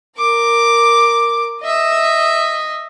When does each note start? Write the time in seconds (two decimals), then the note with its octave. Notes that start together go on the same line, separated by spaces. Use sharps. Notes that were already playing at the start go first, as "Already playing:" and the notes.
0.17 A#4 D6
1.61 D#5 E5